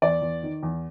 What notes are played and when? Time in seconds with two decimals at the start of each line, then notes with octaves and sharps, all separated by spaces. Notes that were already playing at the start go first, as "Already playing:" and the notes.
0.02 E2 D5
0.22 E2
0.43 D#3
0.63 E2